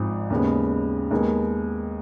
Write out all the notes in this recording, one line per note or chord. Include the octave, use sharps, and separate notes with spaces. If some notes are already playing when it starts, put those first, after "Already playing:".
Already playing: G#1 G#2 F3
D#2 C#3 G#3 B3
D#2 D#3 G#3 B3